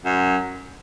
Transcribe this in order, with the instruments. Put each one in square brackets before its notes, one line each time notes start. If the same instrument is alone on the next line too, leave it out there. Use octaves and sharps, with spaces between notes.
[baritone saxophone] F#2